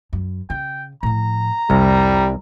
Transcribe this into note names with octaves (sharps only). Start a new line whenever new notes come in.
F#2
C#3 G5
A2 F3 A#5
C2 F2 G3